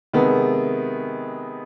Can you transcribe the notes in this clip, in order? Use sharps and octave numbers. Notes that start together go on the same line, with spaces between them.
C3 D#3 G#3 B3